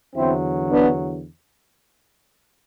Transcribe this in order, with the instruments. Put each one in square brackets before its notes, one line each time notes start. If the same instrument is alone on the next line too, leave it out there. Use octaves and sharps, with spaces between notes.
[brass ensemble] E2 D3 F#3 C4 E4
B3 D4